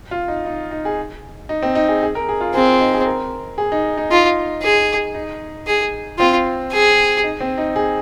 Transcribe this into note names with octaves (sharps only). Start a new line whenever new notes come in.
F4
D#4
D#4
D#4
G#4
D#4
C4
D#4
G#4
G#4
A#4
G#4
F4
C4 G#4
F4
D#4
G#4
A#4
G#4
D#4
D#4
D#4 F4
G#4
D#4
G#4
C4 F4
G#4
D#4
C4
D#4
G#4